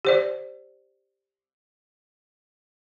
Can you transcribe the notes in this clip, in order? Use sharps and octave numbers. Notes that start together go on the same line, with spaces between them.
G4 C5 D5